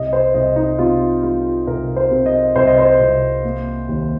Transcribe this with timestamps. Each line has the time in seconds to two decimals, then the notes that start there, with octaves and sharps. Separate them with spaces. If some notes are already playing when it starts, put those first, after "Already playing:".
Already playing: C2 D#5
0.13 C5
0.34 C2 D#5
0.56 D#4
0.78 C3 F4
1.23 G3 F4
1.67 C2 A#4
1.96 C5
2.11 C3
2.26 D#5
2.56 C2 C5
2.67 D#5
2.79 C5
3.00 C2
3.44 A#3
3.89 D#2